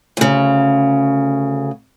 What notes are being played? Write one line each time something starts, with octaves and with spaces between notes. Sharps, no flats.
D2 C#3